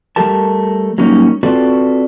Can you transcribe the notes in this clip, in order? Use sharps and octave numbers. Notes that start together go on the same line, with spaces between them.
G3 A3 G4 A#4 A5
F#3 G3 A#3 C#4 D#4
C4 F4 F#4 A4 B4 D5